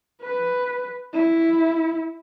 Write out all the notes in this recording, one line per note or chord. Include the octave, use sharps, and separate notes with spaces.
B4
E4